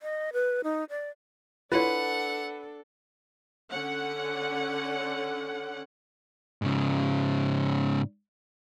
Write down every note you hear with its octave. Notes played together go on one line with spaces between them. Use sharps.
D#5
B4
D#4
D5
D4 E4 F4 A4 B4 C#5 F#5
D3 C#4 F#5
G#2 C#3